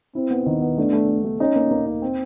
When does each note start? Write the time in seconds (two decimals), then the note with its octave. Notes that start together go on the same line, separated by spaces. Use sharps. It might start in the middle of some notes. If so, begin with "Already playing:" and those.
0.15 C4 E4
0.31 B3
0.46 D#3
0.62 B3
0.78 A3 D4
0.93 A3
1.09 A3
1.24 A3
1.40 C#4 D#4
1.56 A#3
1.71 A#3
1.86 D#4
2.02 C4